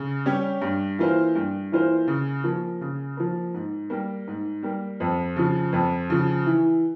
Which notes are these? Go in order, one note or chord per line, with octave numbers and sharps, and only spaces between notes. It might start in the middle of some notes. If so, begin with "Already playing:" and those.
Already playing: C#3
G3 C#4 G4 C#5
G2
E3 A#3 F4 C5
G2
E3 A#3 F4 C5
C#3
F3 A#3
C#3
F3 A#3
G#2
G3 A#3
G#2
G3 A#3
F2
C#3 F3
F2
C#3 F3
E3